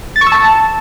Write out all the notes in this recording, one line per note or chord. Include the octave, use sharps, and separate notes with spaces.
A6
C#6
E6
A5